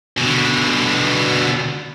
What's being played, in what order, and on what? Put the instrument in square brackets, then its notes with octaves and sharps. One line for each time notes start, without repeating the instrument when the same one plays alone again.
[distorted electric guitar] B2 D3